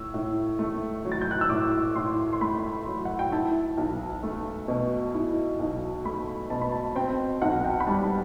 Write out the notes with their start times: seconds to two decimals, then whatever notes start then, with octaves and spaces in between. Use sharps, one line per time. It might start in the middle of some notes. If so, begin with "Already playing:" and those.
Already playing: A2 E6
0.14 A2
0.59 A3
1.05 F#3
1.12 A6
1.21 G6
1.31 F#6
1.41 E6
1.50 A2 D6
1.96 A2 C6
2.33 C6
2.41 A3 B5
2.87 F#3
3.05 F#5
3.19 G5
3.32 E4 A5
3.77 B1
4.23 A3
4.68 B2
5.14 E4
5.60 B1
6.05 A3 B5
6.50 B2 A5
6.61 B5
6.72 A5
6.95 C4 G5
7.42 B1 F#5
7.65 G5
7.80 B5
7.87 G3 A5